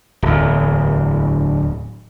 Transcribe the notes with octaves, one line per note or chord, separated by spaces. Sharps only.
D1 E2